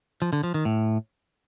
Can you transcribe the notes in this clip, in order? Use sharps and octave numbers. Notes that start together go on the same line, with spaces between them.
F3
D3
F3
D#3
A2